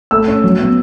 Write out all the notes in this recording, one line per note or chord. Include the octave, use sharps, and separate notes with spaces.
A3 E6
C#4
F#3
B3